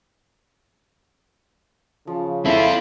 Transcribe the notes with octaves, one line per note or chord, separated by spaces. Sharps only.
C#3 F3
C4 E4 F4 A4 F5